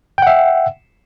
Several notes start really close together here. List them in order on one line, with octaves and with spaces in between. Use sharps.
G5 F#5 E5